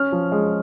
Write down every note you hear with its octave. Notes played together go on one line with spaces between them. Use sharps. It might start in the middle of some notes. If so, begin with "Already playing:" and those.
Already playing: C#4 F6
F3
G#3